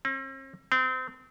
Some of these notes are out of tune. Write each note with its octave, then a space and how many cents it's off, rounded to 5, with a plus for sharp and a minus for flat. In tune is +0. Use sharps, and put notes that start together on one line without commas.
C4 +45
C4 -30